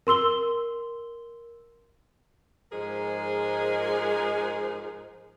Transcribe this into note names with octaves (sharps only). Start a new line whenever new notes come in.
A#4 C6 E6 G7
G#2 F3 G#3 G#4 A#4